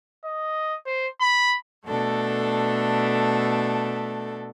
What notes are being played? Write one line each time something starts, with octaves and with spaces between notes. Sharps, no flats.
D#5
C5
B5
B2 A3 D4 A4